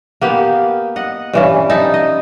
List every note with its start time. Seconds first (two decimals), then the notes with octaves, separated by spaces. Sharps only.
0.21 A#3 B3 G4
0.96 D#5 F#5
1.33 G2 E3 C#4
1.70 D#4 E4 A4
1.94 D#5